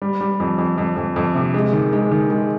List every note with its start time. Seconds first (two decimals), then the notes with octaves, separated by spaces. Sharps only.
0.02 G3
0.21 G3
0.40 F2
0.58 F2
0.78 F2
0.96 F2
1.16 F2
1.35 C3
1.54 G#3
1.73 D#3
1.93 G#3
2.11 D#3
2.30 G#3